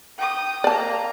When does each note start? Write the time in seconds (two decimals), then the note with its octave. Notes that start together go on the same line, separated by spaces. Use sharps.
0.18 G5 D#6
0.64 A#3 D5 A5 A#5